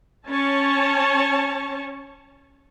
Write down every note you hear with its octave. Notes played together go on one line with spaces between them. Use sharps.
C#4 C#5 A5